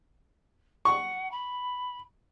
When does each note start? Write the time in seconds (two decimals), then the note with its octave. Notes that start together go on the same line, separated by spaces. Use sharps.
0.85 F#5 C#6
1.31 B5